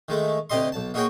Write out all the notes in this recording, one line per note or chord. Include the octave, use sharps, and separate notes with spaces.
D#3 G#3 A3
D2 C3 G4 D#5 C6
B1 A5
A#3 D#4 F#4 G#4 C#5 G5